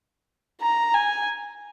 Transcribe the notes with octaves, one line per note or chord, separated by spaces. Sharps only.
A#5
G#5